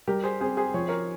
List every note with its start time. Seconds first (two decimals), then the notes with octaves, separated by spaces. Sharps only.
0.08 G3 G4 A#4
0.23 G#4 C5
0.41 C4 G#4 C5
0.57 G#4 C5
0.74 F3 C#5
0.89 A#4 C#5